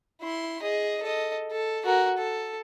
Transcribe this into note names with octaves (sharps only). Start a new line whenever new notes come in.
E4 C6
G#4 D#5
A4 D#5
A4
F#4 A#4
A4